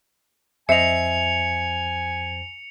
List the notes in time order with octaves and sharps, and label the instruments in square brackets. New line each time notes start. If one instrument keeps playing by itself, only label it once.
[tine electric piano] F2 C5 C7 [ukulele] D#5 E5 [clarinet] G#5 [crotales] C#7 F7